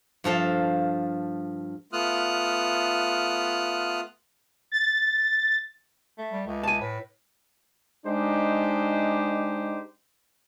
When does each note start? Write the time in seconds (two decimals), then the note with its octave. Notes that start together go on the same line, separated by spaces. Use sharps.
0.24 G2 F3 A4 F5
1.93 A3 B3 F4 D#6 F6 F#6
4.72 A6
6.18 A3
6.32 G3
6.46 C#2 A3
6.64 G#5 A5
6.81 A2 B4
8.06 G#3 D4 D#4 G4 C5